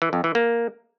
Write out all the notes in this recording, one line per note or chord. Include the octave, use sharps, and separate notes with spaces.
E3
F2
E3
A#3